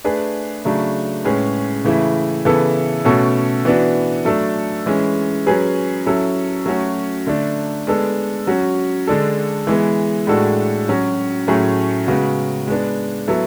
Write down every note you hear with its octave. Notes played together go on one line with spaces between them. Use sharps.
A3 D4 G#4 B4
C#3 F#3 A3 D4
A2 G#3 C#4 G#4 B4
C#3 E3 A3 E4
C#3 E3 B3 E4 A4
B2 A3 C#4 F#4 A4
E3 B3 D4 F#4
F#3 A3 D4 A4
E3 G#3 C#4
F#3 C#4 G#4 B4
F#3 C#4 E4 A4
F#3 A3 C#4 F#4
D3 A3 D4
G#3 B3 D4 A4
F#3 C#4 F#4
D3 G#3 D4 A4
E3 G#3 B3
A2 G#3 D4 F#4 A4
F#3 C#4 F#4
A2 F#3 A3 C#4 G#4
C#3 G#3 B3 F#4
G#3 B3 D4
F#3 B3 E4 A4